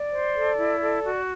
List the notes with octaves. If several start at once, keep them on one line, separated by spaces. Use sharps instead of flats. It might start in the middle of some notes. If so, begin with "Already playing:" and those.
Already playing: D5
C5
A4
E4
A4
F#4